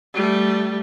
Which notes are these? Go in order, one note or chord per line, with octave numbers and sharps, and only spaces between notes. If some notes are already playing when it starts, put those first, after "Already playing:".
G3 A3